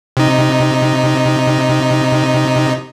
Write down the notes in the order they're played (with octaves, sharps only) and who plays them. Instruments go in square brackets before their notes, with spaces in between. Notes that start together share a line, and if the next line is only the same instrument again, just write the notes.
[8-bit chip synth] C3 D#4